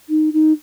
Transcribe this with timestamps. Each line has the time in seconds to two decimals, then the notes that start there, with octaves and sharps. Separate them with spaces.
0.09 D#4
0.33 D#4